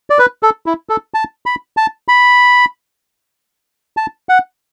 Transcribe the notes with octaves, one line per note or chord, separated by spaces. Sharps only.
D5
B4
A4
E4
A4
A5
B5
A5
B5
A5
F#5